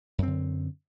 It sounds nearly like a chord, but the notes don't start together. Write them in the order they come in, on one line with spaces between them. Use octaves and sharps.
F#2 C4 D3